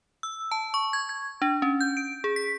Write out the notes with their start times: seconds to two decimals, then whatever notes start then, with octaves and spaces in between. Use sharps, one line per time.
0.23 E6
0.51 A5
0.74 C#6
0.93 G#6
1.09 G#6
1.42 D4
1.62 C#4
1.81 G6
1.97 D7
2.24 G#4
2.36 B6